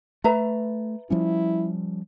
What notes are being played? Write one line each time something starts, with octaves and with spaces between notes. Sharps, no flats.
A3 B4 E5 A#5
F3 G3 C#4 E4